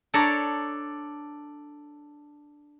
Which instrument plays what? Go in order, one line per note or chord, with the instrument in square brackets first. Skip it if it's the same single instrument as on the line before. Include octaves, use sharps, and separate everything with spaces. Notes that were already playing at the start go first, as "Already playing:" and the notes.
[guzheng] D4 A4 C#5 D5 A#5